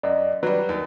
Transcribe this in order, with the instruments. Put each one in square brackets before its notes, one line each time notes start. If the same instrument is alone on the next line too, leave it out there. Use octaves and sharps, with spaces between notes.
[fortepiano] F#2 [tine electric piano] D5 D#5
[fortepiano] F#3 G3 [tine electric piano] B4
[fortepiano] D#2